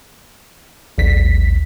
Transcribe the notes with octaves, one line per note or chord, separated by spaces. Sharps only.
A1 D#2 B6